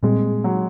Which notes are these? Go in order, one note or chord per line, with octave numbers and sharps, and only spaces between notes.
A#2 G3 G#3 C4
F#3